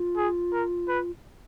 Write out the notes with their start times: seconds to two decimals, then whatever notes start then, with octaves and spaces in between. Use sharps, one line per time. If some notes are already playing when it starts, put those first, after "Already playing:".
Already playing: F4
0.17 G#4
0.52 A#4
0.88 B4